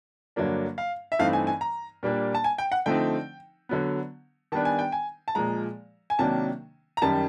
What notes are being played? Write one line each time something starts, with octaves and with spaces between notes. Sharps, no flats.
G2 D3 F#3 A#3 D4
F5
E5
G2 E3 A3 C4 D#4 F5
G#5
G#5
A#5
A#2 G3 A#3 D4
A5
G#5
G5
F#5
D3 F3 A3 C4 D#4 G5
D3 F#3 B3
D#3 G3 B3 D4 A5
G#5
G5
G#5
A5
A#2 F3 G#3 A#5
G#5
C3 D#3 F#3 A#3 D4 A5
A#5
F#2 D#3 G3 A5